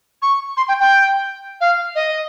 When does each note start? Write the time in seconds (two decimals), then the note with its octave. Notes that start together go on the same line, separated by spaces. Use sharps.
0.22 C#6
0.57 C6
0.68 G5
0.80 G5
1.61 F5
1.95 D#5